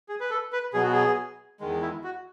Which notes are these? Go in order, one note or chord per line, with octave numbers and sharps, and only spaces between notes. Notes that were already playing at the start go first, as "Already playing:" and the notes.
G#4
B4
A4
B4
B2 F#3 B3 G#4
F#4
G#4
E2 D#3 G#3
E4
F#4